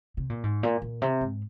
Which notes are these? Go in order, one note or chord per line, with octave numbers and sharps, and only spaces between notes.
C3
A#2
G#2
A#2
A#2
C3
G#2